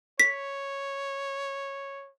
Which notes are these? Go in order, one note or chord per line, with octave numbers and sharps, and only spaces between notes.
C#5 B6